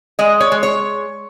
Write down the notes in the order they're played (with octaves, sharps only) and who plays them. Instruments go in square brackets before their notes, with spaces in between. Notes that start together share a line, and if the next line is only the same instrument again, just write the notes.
[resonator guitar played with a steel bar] G#3 D#5
C#5
G#3
C#5